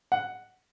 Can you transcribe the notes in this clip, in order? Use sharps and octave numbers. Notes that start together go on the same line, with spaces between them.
F#5